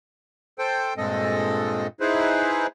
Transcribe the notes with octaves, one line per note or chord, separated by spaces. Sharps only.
A4 C5 G5
G2 A#2 G#3 C4 A4 D#5
D#4 E4 G#4 B4 C5